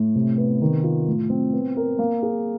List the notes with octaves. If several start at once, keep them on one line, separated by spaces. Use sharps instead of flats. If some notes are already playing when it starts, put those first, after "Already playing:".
Already playing: A2
C3
B3
D#3
F4
A2
C4
B3
A#4
A#3
G#4